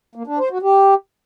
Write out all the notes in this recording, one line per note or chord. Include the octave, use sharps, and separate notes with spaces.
A#3
D4
C5
F#4
G4